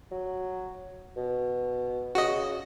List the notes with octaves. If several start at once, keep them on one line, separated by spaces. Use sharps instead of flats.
F#3
B2
C#3 F#4 D#5